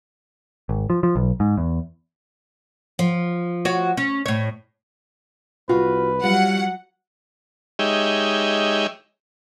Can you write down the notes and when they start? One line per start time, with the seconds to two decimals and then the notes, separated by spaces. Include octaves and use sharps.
0.69 G#1
0.90 F3
1.03 F3
1.16 B1
1.40 G#2
1.57 E2
2.99 F3
3.65 F#4 C#5
3.97 C#4
4.26 A2 C#5
5.69 C2 F4 F#4 B4
6.23 F#3 G3 F4 F#5
7.79 G#3 D#4 G4 C#5 E5